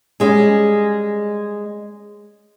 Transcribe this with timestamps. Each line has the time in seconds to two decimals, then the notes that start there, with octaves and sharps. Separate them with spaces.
0.20 G3 G#3 C#4